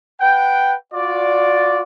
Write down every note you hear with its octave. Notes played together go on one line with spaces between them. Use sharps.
B4 F#5 G5
F4 F#4 D5